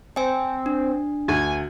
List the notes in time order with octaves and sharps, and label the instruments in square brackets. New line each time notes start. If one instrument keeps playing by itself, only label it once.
[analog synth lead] C4 [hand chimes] G5 G#5
[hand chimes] D4
[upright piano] D2 [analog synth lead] G#5